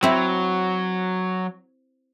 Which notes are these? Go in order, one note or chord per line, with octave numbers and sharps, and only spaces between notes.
F#3 C4 E4